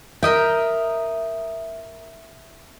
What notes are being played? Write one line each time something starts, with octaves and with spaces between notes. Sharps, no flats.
A#4 D#5 E5 G5